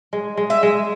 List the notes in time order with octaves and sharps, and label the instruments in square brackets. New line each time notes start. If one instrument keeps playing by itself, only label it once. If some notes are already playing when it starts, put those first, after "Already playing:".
[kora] G#3
G#3
[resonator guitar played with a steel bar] E5
[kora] G#3